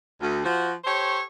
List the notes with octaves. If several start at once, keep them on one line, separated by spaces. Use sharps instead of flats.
D2
F3 F#4
G4 A4 C5 C#5